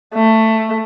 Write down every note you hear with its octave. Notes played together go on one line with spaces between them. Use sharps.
A3